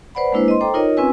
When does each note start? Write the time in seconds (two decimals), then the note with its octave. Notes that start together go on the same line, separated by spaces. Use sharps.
0.15 B4 C5 D5 F#5 B5
0.32 G#3 A#3 D4 E4 B4 C5
0.48 D#5 C6
0.61 A4 C5 G5 A#5 D6
0.74 D#4 F4 A#4 C#5 D#5
0.97 C4 C#4 F4 B4 G#5 E6